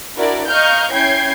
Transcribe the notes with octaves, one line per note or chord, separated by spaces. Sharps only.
D4 E4 F#4 A#4 D5
D#5 F5 A#5 C#6 F6 G6
C#4 E4 G5 G6 G#6 C7